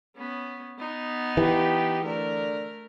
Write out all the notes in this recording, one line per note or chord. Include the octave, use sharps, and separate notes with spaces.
B3 C#4
B3 D#4
E3 G4
D3 A3 A#4